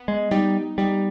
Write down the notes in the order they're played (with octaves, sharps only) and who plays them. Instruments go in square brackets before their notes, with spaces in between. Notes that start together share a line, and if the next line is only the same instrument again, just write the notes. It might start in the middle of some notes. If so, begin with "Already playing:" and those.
Already playing: [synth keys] B3
[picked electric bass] G#3
[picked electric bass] G3 [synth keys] D#4
[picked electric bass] G3 [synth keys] D#4